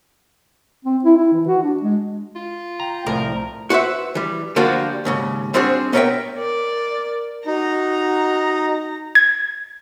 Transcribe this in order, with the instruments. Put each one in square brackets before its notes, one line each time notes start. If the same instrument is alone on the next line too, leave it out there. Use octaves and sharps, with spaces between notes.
[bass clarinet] C4
E4
E4
E3
F#4
D4
G#3
[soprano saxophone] F4
[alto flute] G5 [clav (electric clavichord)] A#5
[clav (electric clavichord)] C2 A2 F3 [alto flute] A3 [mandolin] A#4
[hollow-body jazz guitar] F#4 B4 C5 E5
E3 G3
D3 F3 G3 A#3 F4 F#4
D#2 G#2 C#3
G3 C4 D4 F#4 G#4
B3 C#4 A#4 D5 E5 G5
[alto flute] A#4 [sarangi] D5
[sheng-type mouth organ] D#4 [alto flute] F#4 [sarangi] A#5
[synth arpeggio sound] G#6